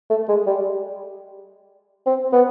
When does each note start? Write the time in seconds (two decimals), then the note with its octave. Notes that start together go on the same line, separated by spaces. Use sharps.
0.10 A3
0.29 G#3
0.47 G3
2.06 C4
2.33 B3